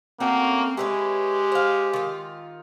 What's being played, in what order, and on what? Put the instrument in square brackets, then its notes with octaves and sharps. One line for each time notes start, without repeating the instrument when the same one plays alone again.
[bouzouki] A3 C#4 F#4 [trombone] A#3 [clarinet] C4
[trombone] G#3 [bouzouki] E4 B4 C#5 [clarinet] G4
[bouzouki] C5 F5
D#3 F4